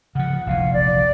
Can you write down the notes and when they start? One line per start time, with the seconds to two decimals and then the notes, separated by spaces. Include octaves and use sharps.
0.15 C#3 F3 F#5
0.47 F1 A#1 E3 F5
0.73 D5